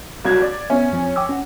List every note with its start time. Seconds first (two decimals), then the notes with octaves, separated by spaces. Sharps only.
0.25 C2 F#3 G#6
0.42 D5
0.70 B3 C#4 E5
0.91 F2 F3 C4
1.16 G5 D6 E6
1.29 C#4 F#5